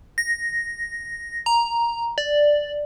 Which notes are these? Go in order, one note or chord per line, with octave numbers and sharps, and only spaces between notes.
A#6
A#5
D5